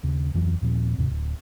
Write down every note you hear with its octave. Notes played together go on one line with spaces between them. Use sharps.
D#2 C#3
D1 F2 E3 F#3
D#2 A#2 F3 C4
D#2 G#2 C3
D1